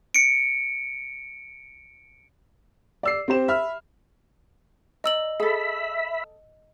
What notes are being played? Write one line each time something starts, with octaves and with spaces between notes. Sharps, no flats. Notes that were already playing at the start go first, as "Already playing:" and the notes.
C#7 D7
D5 E6 C7
C4 G4 C5 E7
E5 B5 F6
D5 D#5 A#5 E6 F#7
G#4 A4 E5 B5